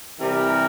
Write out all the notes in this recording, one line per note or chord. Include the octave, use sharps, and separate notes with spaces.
C3 E3 G3 A#4